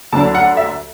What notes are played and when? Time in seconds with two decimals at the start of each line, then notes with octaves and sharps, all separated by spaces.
0.12 D2 D3 F#3 D4 A5
0.35 F#5
0.57 E5